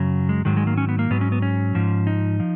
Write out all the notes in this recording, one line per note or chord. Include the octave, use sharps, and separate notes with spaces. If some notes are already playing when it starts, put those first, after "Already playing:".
Already playing: F#2 C#3 F#3
G#3
G#2 D#3 F#3 G#3
G#3
A#3
C#4
B3
A#3
G#2 F#3 B3
C#4
B3
C#4
G#2 F3
D#4
F3